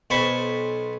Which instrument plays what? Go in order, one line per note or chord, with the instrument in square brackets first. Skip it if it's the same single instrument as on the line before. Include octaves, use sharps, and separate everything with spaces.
[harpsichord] B1 C5 A5 B5 C#6